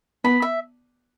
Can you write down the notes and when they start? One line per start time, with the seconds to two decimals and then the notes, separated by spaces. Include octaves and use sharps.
0.24 B3 B5
0.42 E5